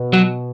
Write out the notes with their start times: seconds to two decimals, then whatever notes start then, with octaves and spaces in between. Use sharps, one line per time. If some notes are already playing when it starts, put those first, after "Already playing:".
Already playing: B2
0.13 F#3